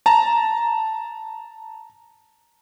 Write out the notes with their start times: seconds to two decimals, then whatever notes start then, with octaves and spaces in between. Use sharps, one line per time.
0.06 A5 A#5